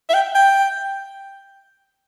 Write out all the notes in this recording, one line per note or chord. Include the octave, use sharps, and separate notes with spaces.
E5
G5
G5